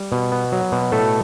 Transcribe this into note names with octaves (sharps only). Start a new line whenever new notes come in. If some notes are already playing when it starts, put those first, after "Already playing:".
Already playing: G3
B2
B3
F#3
B2
A2 A3 A4